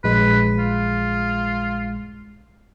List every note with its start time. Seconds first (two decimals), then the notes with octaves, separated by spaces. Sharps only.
0.04 A#1 G#3 B4
0.58 F4